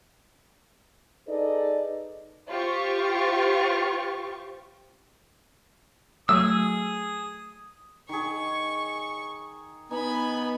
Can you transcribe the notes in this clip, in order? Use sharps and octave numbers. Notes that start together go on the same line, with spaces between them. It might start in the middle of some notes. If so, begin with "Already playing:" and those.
D#4 G#4 A4 B4 D5 D#5
F4 G4 C5 C#6
F#3 A3 G#4 D#6 E6
D#3 G#4 C#6
B3 D#4 G#5 B5